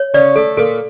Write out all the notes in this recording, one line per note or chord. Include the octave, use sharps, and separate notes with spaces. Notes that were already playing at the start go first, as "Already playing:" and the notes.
Already playing: C#5
C#3 C#4 D5
A3 A4
A#2 A#3 A4